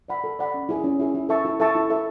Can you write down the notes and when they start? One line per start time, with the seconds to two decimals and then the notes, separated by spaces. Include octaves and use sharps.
0.08 D5 F#5 B5
0.24 A4
0.39 D5 F#5 B5
0.54 C#4
0.69 E4 G#4
0.84 C#4
1.00 E4 G#4
1.15 E4
1.29 A4 E5 A5 C#6
1.45 E4
1.60 A4 E5 A5 C#6
1.75 E4
1.90 A4 E5